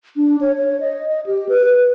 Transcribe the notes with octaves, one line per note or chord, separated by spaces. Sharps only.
D4
C#5
C#5
D#5
D#5
G4
B4
B4